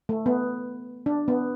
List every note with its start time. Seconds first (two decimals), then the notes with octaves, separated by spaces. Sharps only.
0.09 A3
0.26 B3
1.06 D4
1.28 B3